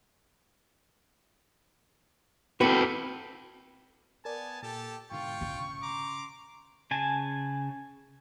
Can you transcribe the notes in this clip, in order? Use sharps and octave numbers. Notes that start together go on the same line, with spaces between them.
C4 E4 F#4 A4 B4 G5
B3 A#4 D5 G#5 A5
A#2 G4 A4 A5
G#2 B2 D3 F4 G5 C#6
C#3
A#5 C6 D6
C#3 G#5 A5